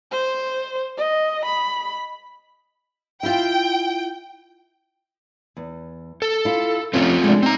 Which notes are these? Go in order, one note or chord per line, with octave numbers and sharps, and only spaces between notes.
C5
D#5
B5
E4 F4 G5
E2
A4
E4 F4
F3 A3 C4 C#4 F4
G#3 D4
C4 D#4 A#5